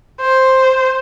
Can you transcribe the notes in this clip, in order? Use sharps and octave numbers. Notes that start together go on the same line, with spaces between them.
C5